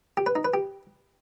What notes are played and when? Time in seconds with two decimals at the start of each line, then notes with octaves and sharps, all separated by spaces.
0.17 G4
0.26 B4
0.35 D#4
0.45 B4
0.54 G4